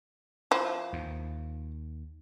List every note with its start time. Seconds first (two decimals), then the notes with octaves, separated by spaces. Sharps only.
0.51 F3 E4
0.93 D#2